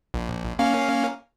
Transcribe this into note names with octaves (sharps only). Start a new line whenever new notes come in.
A#1
A#3 C#4 F5